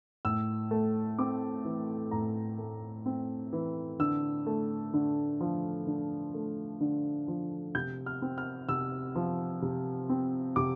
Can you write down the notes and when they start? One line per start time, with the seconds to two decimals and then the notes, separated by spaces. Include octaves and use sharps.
0.25 A2 E6
0.71 A3
1.19 C4 D6
1.65 E3
2.11 A2 A#5
2.58 A3
3.06 C4
3.53 E3
3.99 D3 E6
4.46 A3
4.93 D3
5.41 F3
5.87 D3
6.34 A3
6.81 D3
7.28 F3
7.75 C3 G6
8.06 F6
8.22 C4
8.38 F6
8.69 C3 E6
9.16 F3
9.62 C3
10.09 C4
10.56 C3 D6